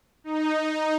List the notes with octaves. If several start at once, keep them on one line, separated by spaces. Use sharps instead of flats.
D#4